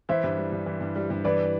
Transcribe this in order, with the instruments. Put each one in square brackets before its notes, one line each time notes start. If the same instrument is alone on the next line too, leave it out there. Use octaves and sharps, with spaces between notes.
[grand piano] E3 [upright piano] C5 E5
[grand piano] G2
G3
G2
E3
G2
G3
G2
[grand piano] E3 [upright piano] B4 D5